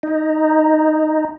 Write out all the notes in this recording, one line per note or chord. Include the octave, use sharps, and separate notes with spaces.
D#4